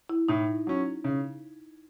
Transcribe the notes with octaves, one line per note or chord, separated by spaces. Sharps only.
E4
A2 D#4
F#3 C#4
C#3